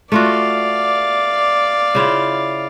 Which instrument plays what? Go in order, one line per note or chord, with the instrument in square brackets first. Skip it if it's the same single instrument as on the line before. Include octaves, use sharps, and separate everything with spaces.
[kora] A3 F4 F#4 [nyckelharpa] D5 F5
[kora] C#3 E4 F4